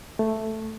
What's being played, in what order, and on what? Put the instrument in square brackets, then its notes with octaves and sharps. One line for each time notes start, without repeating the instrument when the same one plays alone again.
[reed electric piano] A3